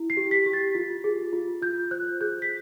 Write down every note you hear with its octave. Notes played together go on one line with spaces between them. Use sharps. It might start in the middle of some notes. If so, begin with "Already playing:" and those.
Already playing: E4
C7
G4
B6
G4
A6
F4
G#4
F4
F4 G6
C5 F#6
G#4 G6
B6